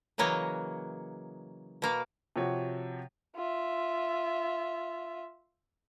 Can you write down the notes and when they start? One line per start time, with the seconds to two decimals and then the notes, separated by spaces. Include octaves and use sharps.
0.18 C#3 E3 F#3 A#3 C#5 D#5
1.82 B2 A#3 F5
2.36 C3 F3 F#4 C#5
3.35 F4 E5